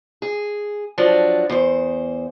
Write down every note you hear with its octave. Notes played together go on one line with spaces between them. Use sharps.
G#4
F3 F#3 D4 F#4
E2 C5